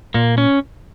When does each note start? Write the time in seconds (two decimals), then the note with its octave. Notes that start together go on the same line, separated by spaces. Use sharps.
0.14 A#2 A#3
0.38 C#4